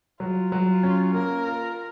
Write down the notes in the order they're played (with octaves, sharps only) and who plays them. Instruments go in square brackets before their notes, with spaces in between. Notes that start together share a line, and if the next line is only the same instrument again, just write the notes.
[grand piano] F#3 [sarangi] F4
[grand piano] F#3
[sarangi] F4
[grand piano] C#4
[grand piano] A#3 [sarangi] A#4
[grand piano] F4